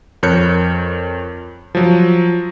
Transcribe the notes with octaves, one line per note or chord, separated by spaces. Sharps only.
F2 A#4 C#5 F#6 G6 C#7
F3 F#3